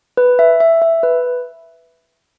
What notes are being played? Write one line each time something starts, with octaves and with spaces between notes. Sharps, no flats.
B4
E5
E5
E5
B4